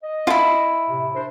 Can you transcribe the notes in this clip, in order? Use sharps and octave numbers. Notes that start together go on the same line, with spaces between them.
D#5
E4 F4
A2 C3
D4 A#4 C5